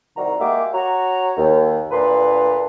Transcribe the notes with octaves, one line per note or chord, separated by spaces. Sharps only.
C2 D#3 G3 F#4 A#5
G#3 A#3 F#4 G4 E5 D6
F#4 C#5 A#5
D#2
D2 A#2 D4 B4 A#5 C6